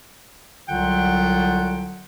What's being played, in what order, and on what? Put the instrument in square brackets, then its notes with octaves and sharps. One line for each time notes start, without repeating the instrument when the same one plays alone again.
[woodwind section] C2 D3 F#3 F4 F#5 G5